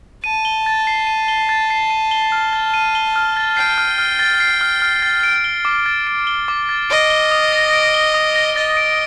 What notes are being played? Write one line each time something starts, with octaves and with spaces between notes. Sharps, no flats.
A5 D#7
G7
A6
C7
D#7
G7
A6
C7
D#7
G7
F6
A6
D#7
G7
F6
A6
G5 C7
F6
F6
A6
C7
F6
F6
A6
D7
G7
D6
A6
D7
G7
D6
A6
D#5 D7
G7
D#6
A#6
D7
G7
D#6
A#6
D#5 A6
D7